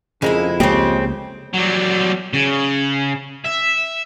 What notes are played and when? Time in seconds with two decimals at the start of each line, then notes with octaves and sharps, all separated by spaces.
0.22 F2 C#3 G#3 A#3 E4
0.60 C#2 C#3 G#3 A#3 C4 G4
1.53 F#3 G3
2.33 C#3
3.44 E5